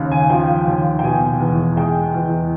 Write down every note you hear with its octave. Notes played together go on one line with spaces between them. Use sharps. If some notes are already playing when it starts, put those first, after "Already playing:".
Already playing: D#2 C#3
G#5
F3 G5
D#2
G5
B2 G#5
E2
G#3 G5
E2